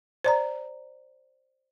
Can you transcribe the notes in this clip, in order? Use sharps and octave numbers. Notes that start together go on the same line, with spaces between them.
C5 D5 A#5